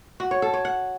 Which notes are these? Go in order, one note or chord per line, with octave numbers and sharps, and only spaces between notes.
F#4
C#5
A4
C#5
F#5